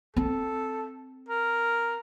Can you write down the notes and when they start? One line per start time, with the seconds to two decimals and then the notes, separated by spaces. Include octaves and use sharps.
0.17 C4 A4
1.29 A#4